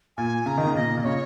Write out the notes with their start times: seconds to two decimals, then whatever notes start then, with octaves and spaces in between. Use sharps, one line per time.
0.17 A#2 G#5
0.46 C#3 A#5
0.57 D#3
0.67 C#3
0.75 A#2 D#5
0.97 A#2
1.04 C#3 C#5